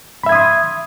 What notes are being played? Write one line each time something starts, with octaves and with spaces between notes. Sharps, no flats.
E5 B5 C6 D#6 G#6